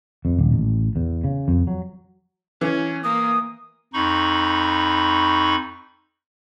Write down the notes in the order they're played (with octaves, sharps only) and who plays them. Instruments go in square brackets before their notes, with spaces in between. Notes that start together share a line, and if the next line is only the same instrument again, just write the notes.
[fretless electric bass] F2
D#1
A1
E2
C#3
F2
F#3
[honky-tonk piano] E3 [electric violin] C#4
[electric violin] A#3 [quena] D#6
[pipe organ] F2 D#4 B5 C#6